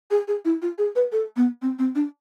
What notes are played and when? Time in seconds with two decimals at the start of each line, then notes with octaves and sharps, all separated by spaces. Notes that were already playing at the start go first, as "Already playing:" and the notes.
0.10 G#4
0.28 G#4
0.45 E4
0.62 F4
0.78 G#4
0.95 B4
1.12 A4
1.36 B3
1.62 C4
1.79 C4
1.95 D4